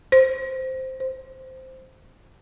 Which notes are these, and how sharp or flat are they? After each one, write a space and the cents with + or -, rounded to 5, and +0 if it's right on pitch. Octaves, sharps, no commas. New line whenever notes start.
C5 -5
C5 -5